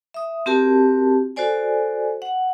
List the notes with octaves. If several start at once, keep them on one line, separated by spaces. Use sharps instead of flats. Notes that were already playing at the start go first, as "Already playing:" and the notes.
E5 D#6
C4 F#4 G4 A#4 A5
F#4 A4 C5 D5 G#5
F#5